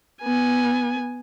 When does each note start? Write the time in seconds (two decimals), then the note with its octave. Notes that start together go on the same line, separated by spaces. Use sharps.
0.22 B3 G#5